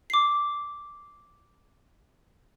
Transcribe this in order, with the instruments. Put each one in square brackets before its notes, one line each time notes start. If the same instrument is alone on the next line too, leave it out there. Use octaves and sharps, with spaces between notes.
[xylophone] D6 C7